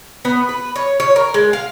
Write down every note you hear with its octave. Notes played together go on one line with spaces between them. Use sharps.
B3
B4
C#5
C#5
A#4
G#3
F5